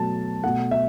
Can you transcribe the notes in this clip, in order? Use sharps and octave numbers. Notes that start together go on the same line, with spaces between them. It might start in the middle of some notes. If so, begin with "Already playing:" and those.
Already playing: B2 F#3 A3 A5
B2 A3 F#5
E5